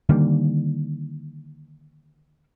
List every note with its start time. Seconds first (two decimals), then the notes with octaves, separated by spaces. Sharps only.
0.09 D3 D#3 G3 A#3